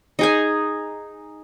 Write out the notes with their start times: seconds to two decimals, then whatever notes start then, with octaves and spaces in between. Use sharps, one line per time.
0.19 D#4 G#4 G#5